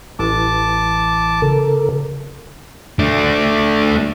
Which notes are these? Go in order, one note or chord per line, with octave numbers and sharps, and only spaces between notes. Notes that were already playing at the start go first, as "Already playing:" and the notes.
A1 E3 A5 D6
C#3 A4 A#4
A3 D4